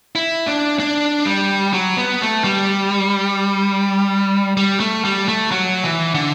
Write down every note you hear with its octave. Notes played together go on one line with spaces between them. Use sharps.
E4
D4
D4
G3
F#3
B3
A3
G3
G3
A3
G3
A3
F#3
E3
D3